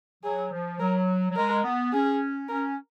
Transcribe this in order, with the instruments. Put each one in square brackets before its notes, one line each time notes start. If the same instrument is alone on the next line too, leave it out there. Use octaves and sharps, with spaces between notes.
[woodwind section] F#3 [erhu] G#4
[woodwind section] F3
[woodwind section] F#3 [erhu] A#4
[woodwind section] F#3
[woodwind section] G#3 [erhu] A#4
[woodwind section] B3
[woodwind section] C#4 [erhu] G#4
[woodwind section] C#4 [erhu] A#4